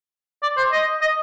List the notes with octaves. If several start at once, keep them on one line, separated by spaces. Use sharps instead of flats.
D5
C5
D#5
D#5